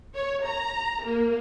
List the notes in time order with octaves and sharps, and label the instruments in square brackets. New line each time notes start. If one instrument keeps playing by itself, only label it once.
[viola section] C#5
A#5
A#3